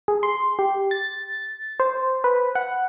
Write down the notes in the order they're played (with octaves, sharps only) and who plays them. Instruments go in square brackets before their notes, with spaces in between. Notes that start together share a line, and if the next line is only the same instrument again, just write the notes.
[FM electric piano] G#4
C6
G4
A6
C5
B4
F#5